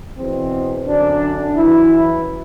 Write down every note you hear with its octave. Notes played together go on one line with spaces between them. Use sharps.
E2 B2 C4
F#2 D3 D4
F#2 E3 E4